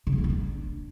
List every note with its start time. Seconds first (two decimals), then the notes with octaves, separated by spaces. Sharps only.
0.07 C#3
0.12 B3
0.18 A#3
0.24 C4
0.30 D4